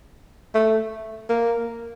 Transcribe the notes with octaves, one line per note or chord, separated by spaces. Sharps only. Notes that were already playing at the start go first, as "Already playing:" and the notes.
A3
A#3